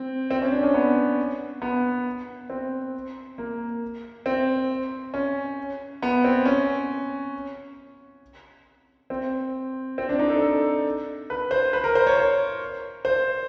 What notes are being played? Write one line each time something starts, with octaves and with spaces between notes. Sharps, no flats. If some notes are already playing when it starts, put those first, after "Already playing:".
Already playing: C4
C4
C#4
D4
C#4
B3
B3
C4
A#3
C4
C#4
B3
C4
C#4
C4
C4
D4
D#4
A4
A4
B4
C5
B4
A#4
C5
C#5
C#5
C5